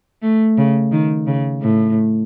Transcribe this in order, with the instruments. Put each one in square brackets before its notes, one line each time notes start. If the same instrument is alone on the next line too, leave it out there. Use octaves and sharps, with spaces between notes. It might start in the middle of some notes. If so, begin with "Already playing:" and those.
[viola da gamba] A3
C#3
D#3
C#3
A2